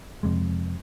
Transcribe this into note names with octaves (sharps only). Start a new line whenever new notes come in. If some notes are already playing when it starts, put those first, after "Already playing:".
F2 C3 G#3